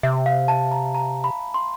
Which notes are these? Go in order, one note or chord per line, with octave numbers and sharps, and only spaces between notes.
C3 E5
F5
A5
A#5
A#5
B5
C6